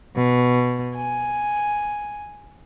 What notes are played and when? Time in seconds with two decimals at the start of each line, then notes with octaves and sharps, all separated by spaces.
0.16 B2
0.96 G#5